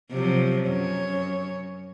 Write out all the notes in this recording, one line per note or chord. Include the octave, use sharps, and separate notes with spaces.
C3 F3 F#3
F#2 C#5